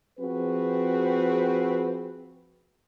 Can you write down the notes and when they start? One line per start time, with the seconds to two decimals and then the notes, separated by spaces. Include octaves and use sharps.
0.19 F3 C4 F#4 G#4 B4